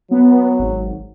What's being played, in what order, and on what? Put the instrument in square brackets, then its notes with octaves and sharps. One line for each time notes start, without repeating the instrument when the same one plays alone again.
[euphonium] F#3 [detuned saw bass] B3
[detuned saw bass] G#1